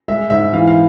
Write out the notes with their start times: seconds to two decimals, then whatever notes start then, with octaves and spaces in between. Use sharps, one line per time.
0.08 G#3 E5
0.30 G#2 E5
0.53 E3 F5
0.67 F5